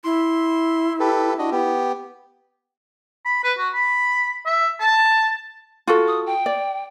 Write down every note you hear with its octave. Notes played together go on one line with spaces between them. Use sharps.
E4 C6
G4 A4 B4
D4 F#4 D#5
B3 G4
B5
B4
F#4
B5
E5
A5
F4 F#4 A4
D#6
G5
D5